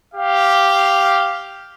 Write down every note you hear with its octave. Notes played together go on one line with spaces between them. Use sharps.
G4 F5